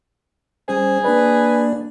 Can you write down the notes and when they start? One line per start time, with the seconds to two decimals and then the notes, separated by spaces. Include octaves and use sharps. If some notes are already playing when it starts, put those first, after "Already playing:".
0.68 G3 C#4 G#4 C5
1.05 A#3 D4 B4 D5